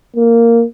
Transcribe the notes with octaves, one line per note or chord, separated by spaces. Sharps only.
A#3